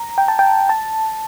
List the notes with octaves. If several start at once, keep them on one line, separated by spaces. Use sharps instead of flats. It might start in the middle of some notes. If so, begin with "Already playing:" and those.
Already playing: A#5
G5
A5
G5
A5